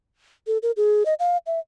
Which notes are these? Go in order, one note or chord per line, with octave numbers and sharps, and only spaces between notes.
A4
A#4
G#4
D#5
F5
E5